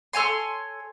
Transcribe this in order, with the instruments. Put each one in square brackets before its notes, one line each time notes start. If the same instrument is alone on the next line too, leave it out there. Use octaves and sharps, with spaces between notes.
[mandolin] A4 C#5 G#5 C6